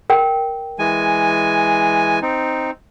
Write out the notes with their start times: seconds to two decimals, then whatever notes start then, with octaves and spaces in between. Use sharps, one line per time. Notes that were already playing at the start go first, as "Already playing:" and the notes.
0.10 A#4 G5
0.79 E3 G#3 G#5
2.22 C4 D#4